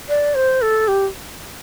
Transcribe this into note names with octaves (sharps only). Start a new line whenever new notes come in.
D5
C5
A4
G4